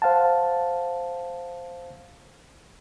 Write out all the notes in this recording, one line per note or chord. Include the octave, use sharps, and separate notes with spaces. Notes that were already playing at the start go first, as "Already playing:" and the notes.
C5 F5 F#5 A5